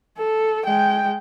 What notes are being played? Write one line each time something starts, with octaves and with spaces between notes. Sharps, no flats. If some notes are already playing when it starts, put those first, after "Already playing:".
A4
G#3 G5